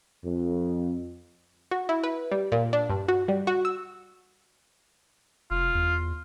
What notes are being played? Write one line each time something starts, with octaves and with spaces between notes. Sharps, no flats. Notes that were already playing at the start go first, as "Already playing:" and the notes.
F2
F#4
E4
B4
G3
A#2
D4
G2
F#4
G3
F#4
E6
F1 F4
E2